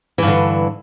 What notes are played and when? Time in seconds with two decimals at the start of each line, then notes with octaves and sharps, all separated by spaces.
0.18 E3
0.23 G2
0.27 D3